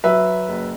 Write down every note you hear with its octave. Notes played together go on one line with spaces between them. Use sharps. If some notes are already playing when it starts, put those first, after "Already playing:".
F#3 B4 E5
F#1